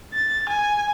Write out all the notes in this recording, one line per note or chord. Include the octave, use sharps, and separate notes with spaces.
A6
G#5